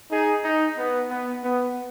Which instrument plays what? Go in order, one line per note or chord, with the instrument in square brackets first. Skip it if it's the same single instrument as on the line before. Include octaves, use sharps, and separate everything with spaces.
[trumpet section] D#4 G#4
D#4
B3
B3
B3